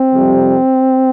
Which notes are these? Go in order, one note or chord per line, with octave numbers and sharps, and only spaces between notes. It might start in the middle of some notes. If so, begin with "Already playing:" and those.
Already playing: C4
F2 C3 G3